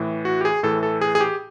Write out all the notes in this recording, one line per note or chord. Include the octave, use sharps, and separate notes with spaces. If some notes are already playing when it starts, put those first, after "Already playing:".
Already playing: A2 E3
F#4
G4
G#4
A2 E3 A4
A4
G#4
G#4
G4